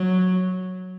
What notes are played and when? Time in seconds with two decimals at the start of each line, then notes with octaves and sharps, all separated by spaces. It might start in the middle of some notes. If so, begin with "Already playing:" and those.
Already playing: F#3